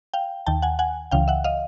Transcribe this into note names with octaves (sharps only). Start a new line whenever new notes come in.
F5 G5
D#2 D#3 G5 A5
F#5 G#5
F#5 G#5
C#2 C#3 E3 F5 G5
E5 F#5
D#5 F5